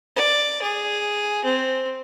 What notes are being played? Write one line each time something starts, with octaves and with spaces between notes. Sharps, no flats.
D5
G#4
C4